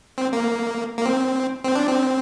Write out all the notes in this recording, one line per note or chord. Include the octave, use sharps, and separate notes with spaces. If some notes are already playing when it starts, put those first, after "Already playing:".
C4
A#3
A#3
C4
C4
D4
C4